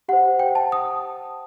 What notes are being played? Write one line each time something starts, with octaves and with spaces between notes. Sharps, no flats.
G4 C5 F#5
G5
A5
D#6